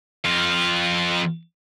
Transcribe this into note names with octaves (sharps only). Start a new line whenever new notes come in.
F2 F4